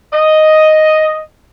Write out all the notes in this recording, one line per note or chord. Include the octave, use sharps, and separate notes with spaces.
D#5